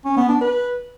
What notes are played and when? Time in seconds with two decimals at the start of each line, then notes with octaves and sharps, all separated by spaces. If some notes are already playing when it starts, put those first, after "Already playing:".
0.05 C#4
0.17 B3
0.29 D4
0.41 B4